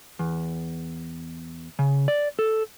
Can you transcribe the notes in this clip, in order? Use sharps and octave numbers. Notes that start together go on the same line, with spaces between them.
E2
C#3
D5
A4